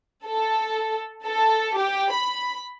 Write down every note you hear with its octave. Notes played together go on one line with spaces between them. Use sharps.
A4
A4
G4
B5